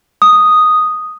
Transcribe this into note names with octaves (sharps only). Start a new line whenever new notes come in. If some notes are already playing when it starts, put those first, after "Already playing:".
D#6